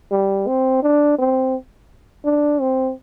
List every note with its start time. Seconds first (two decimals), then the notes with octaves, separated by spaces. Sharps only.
0.12 G3
0.47 C4
0.83 D4
1.18 C4
2.25 D4
2.61 C4